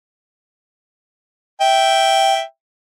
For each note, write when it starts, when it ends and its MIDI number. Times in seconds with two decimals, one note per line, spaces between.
1.61 2.42 76
1.61 2.42 79